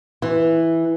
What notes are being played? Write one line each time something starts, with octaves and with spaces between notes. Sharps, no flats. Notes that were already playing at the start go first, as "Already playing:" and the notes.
E3